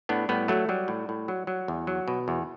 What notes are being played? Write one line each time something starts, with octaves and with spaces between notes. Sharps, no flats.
A2 B3 D4
A2 G3 B3
F#3 A3
F#3 G3
A2
A2
F#3
F#3
E2
F#3
B2
E2